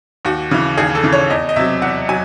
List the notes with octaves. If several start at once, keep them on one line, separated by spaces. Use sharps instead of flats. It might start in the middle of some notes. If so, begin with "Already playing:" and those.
D#2 F#4
C#3 E3
D#2 G#4
A4
C#3 E3
C#5
E2 D#5
D#5
C3 F#3 E5
E2 F#5
F#3 G#5